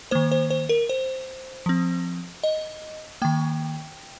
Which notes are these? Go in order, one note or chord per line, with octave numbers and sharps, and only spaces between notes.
D#3 A#3 C5
C5
C5
A#4
C5
F3 C4
D#5
D#3 A#3 G5